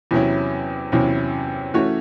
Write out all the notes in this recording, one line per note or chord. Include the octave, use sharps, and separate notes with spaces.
E2 C3 F#3 C#4 E4
E2 C3 F#3 C#4 E4
E3 A3 C#4 F#4 C#5